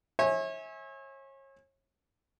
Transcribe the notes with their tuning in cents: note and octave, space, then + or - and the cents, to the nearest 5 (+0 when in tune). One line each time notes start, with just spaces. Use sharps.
C#5 -35 E5 -30 G#5 +0